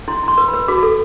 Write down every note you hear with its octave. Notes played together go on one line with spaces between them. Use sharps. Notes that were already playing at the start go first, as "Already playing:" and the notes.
E4 C6
E4 C6
B4
B5
B4
F#4 D6
A4